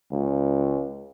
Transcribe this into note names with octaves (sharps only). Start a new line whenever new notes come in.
C#2